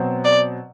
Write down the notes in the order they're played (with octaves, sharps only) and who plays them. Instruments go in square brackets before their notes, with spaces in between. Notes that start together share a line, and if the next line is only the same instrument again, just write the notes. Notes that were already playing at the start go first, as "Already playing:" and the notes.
Already playing: [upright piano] B2 F#3 C4
[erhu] D5